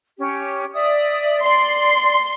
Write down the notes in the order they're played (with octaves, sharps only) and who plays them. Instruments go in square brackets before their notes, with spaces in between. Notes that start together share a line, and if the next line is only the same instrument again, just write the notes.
[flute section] C#4 G4
D5 E5 D#6
[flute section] D5 [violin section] C6